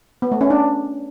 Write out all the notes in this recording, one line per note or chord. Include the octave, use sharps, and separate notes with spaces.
B3
A3
C#4
D4